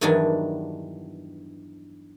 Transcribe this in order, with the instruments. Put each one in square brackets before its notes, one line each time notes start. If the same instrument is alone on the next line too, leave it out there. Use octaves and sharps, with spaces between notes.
[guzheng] E2 G2 D#3 E3 F#3 D4